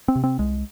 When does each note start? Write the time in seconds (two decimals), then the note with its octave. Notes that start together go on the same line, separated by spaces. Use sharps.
0.08 C4
0.16 C3
0.24 C4
0.39 C2 G#3